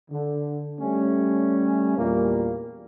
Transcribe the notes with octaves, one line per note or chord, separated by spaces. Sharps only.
D3
G3 A3 C#4
E2 A#2 G3 A#3